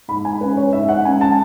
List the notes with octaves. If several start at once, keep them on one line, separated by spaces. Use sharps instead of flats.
G#2 B5
G#5
G#3 C#4 B4
C#5
G#2 E5
F#5
G#3 C#4 G#5
A5